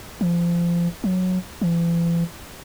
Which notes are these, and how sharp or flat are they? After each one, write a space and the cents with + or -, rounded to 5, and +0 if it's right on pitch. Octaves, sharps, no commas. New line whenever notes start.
F3 -25
F#3 -10
E3 +45